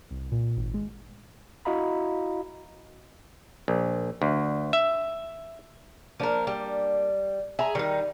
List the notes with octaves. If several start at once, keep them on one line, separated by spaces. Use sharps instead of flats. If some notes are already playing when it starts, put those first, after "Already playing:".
C2
A#2
G#1
G#3
E4 F#4 D#5 F5 A#5 B5
A#1
D2
E5
F3 A#3 D4 A#4
G3
G#4 E5 A#5
D#3 G3 D#4